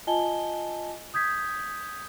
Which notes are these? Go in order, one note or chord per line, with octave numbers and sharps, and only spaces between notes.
F4 D#5 G#5 A5 G7
D#6 G6 G#6 B6